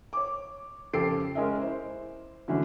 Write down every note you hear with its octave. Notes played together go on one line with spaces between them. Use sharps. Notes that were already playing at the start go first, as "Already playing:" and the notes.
C#5 D6
F2 C#3 G4 A4 C7 D7
G#3 C#4 A#4 D#5 E5
E4 C5
D3 E3 F#3 A3 C#4 D4